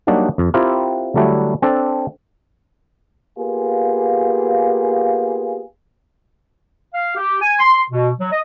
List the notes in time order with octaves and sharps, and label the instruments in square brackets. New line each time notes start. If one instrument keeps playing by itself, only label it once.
[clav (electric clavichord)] F#3 G3 A#3 D4 D#4 F#4
F2
C4 E4 F4 G4 A#4
D3 F#3 G3 A3 D4 E4
C4 D4 A4
[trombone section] A#3 B3 F4 G4 G#4
[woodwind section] F5
G4
G#5
C6
B2
F#3
D#5